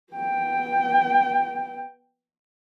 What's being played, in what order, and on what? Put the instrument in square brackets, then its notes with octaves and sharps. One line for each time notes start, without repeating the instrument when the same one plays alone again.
[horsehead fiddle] B3 G5